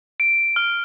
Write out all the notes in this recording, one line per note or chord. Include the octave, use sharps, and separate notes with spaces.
D7
F6